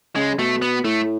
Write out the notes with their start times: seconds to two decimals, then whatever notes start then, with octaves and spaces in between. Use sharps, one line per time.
0.16 C#3 G#3
0.38 B2 A3
0.62 B3
0.84 A2 A3